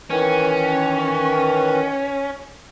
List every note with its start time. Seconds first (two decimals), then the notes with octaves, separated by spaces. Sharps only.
0.10 D#3 E3 C#4